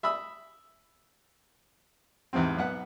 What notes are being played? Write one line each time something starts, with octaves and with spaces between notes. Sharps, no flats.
E5 B5 D#6 E6
E2 G#2 C3 C4
B1 B3 F#5